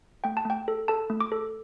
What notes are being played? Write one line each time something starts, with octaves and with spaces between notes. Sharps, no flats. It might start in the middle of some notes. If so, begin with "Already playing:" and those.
A3 G5
A5
A3 G5
A4
A4 A5
A3
D6
A4